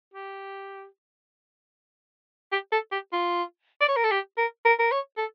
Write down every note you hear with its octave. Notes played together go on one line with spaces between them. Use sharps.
G4
G4
A4
G4
F4
D5
C#5
A#4
A4
G4
A#4
A#4
A#4
C#5
A4